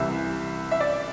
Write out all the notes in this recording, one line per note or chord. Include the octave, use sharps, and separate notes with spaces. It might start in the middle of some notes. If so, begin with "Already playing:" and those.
Already playing: C2 C3 E3 E5
E5
D5